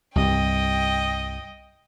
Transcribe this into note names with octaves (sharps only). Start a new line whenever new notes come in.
C2 G2 D#5 G5